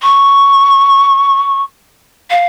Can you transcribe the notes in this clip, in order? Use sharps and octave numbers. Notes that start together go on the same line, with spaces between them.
C#6
F5